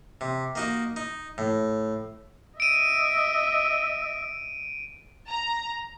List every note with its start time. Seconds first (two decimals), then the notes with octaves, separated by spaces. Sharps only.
0.21 C3
0.55 A#3 D#4 F#4
0.96 D#4
1.38 A2
2.60 D#5 E5 D7 D#7
5.30 A#5